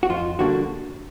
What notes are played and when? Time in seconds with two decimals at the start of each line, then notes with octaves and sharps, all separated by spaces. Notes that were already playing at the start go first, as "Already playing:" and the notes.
0.03 F#4
0.10 F2 F4
0.39 D3 G3 A#3 D4 F#4